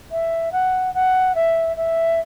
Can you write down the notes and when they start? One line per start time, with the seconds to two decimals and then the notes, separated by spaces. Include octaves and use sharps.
0.11 E5
0.52 F#5
0.94 F#5
1.34 E5
1.76 E5